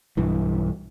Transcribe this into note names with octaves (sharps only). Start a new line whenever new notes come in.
B1 G2 E3